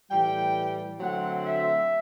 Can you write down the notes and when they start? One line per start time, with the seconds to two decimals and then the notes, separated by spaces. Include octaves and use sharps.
0.10 A2 E3 G3 G5
1.00 D3 F#3 A3 C4 F#5
1.44 E5